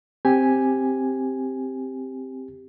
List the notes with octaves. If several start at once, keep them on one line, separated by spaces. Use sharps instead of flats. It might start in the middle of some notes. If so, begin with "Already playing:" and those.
C4 G4 G#5